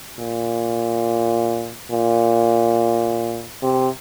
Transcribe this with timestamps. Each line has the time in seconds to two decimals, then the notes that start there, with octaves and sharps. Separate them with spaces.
0.19 A#2
1.91 A#2
3.63 C3